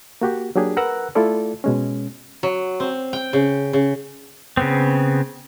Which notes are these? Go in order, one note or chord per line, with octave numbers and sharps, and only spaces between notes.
A#3 F#4 G4
F#3 A#3 D4 G4 G#4
A#4 B4 F#5 A#5 E6 F#6
A3 E4 F4 A4 D5
B2 G#3 C#4
F#3
C4
G5
C#3
C#3
C#3 B3 C4